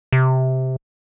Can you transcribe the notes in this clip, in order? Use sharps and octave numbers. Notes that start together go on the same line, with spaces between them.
C3